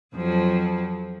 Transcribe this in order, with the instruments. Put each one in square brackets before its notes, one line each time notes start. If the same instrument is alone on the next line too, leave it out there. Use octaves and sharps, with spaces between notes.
[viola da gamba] F2 F3 F#3